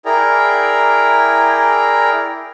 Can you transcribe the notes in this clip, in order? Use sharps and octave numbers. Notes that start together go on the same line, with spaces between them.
E4 G#4 A#4 D5 G5 A#5